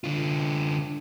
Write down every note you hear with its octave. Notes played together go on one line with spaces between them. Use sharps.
D3 F4